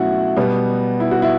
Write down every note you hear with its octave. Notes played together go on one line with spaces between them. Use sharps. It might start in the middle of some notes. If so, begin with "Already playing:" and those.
Already playing: B2 F#3 A3 C#4 E4 F#4
B2 G3 B3
E4
F#4
E4